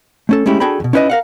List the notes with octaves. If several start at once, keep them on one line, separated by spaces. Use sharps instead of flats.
A3 C#4 A4
G#3 A3 C#4 E4 G4
D4 F#4 G#4 A4 G5 B5
E2 B2
C#4 D#4 E4 B4 D5 D#5
A#4 F5 F#5